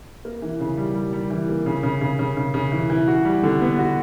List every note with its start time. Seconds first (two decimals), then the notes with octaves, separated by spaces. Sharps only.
0.25 A#3
0.42 E3
0.60 C#3
0.77 G3
0.95 G3
1.13 G3
1.30 E3
1.49 A#3
1.66 C#3
1.83 C#3
2.01 C#3
2.19 C#3
2.37 C#3
2.54 C#3
2.72 E3
2.90 E3
3.08 F#4
3.25 G3
3.43 D3
3.61 B3
3.79 F#4